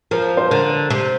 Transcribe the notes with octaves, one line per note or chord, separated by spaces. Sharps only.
F3 A#4
C5
D3 A#4
C3